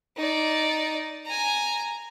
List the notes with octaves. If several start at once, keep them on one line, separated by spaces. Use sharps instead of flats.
D#4 D5
G#5 A#5